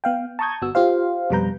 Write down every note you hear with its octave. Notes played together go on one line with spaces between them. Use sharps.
B3 F5 G5
A5 A#5 C#6 D#6 G6 G#6
G1 B3 F#4 E6
F4 G4 C5 F5
F2 B2 G3 B4 A#5 G6